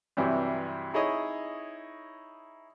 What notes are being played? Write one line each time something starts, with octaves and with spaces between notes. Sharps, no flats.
G2 C3 E3 F#3 G3
D#4 E4 G#4 C#5 D#5